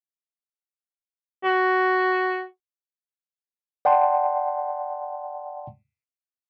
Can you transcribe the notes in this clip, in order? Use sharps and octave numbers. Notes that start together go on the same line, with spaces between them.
F#4
D5 F#5 G5 A5 C6